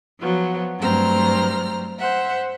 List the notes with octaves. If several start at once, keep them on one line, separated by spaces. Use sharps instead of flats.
F3 F#3 B3
G2 F#3 A3 C4 A#5 F6
C5 E5 F#5